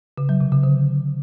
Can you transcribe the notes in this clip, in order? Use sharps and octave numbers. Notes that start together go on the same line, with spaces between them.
C#3
F#3
C3
C#3
D3